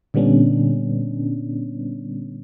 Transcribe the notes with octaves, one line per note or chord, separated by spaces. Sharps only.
A#2 D3 G3 B3 C#4 D4